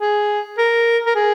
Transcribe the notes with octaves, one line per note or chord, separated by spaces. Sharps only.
G#4
A#4
A#4
G#4